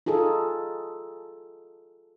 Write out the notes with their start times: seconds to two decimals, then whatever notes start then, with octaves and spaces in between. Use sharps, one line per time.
0.06 D#4 F4 G#4 A4